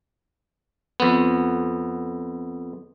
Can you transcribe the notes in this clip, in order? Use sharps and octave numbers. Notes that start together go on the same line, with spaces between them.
F2 B3